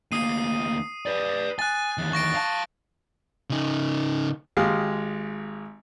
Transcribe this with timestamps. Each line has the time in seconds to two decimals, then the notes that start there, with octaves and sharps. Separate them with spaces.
0.12 D2 A#3 D#6 C7 D#7
1.06 B4 D5
1.59 G#5 F#6 A6
1.98 E2 D#3
2.13 C#6 A#6 D7
2.34 F5 A5
3.50 C#3 D#4
4.57 G#1 G#3 G4 F5 D#6